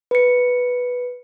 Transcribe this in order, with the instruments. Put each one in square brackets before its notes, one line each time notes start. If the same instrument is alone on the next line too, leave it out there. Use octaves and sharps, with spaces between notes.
[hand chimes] B4 C#7